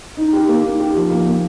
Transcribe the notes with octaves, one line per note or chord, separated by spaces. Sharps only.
D#4
G4
A#3
D#4
G4
F3
A#3
A#3